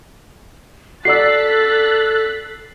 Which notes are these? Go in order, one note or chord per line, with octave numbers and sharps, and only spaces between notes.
F#4 A4 D5 E6 F#6 A6 B6 C7